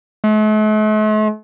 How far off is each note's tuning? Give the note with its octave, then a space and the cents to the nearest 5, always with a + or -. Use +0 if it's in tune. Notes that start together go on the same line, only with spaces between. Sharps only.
A3 -45